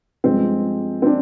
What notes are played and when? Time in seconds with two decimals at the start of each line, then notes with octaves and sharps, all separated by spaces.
0.24 G2 F3 G#3 C4
1.02 C4
1.06 D4